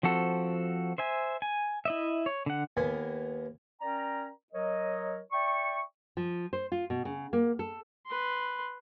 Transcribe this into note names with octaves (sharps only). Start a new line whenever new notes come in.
F3 C4 F#4 A4
C5 E5 G#5
G#5
E4 D#5 E5
C#5
D3 F#5
D#2 B3 G#5
C#4 A#4 D5 G5 A#5
F#3 A#4 C#5 D#5
D5 E5 G5 C#6
F3
C5
F4
B2
C#3
A#3
A4
B4 C6